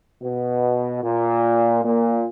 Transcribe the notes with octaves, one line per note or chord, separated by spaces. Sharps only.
B2
A#2
A#2